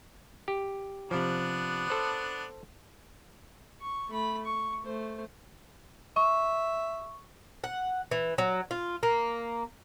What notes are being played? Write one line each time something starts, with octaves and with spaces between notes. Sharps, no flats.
G4
C3 F3 B3 D4
A4 C5
C#6
A3 B5
C#6
A3 C5
E5 C#6
F#5
E3
F#3
F4
A#3